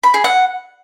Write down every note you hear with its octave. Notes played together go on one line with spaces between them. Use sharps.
B5
G#4
F#5